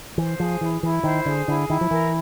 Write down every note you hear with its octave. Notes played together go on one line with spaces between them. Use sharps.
E3 C5
F3 G#4
E3 E4
E3 E4
D#3 C5
D3 G#4
D3 E4
D#3 E4
F3
E3 A#4